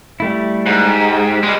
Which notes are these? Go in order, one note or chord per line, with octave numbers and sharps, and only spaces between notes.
G3 A3 E4
G#2
G4
G3 G#3